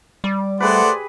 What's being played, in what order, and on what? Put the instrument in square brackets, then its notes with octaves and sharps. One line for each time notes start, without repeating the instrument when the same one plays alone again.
[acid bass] G3 [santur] D6
[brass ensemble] A3 F#5 [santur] G4 G#4 B4 [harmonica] C5 D5